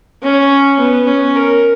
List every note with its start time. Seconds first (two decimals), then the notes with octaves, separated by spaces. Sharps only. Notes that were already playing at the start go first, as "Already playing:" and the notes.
0.23 C#4
0.79 B3
1.07 C#4
1.36 A#4